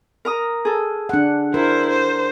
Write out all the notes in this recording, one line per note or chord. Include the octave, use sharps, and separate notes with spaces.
A#4 A#5 D#6
G#4 A4
D4 F#5
E4 A#4 C5
C5